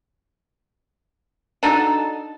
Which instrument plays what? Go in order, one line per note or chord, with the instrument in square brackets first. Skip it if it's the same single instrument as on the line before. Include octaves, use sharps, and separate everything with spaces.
[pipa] D4 D#4 F#4 A4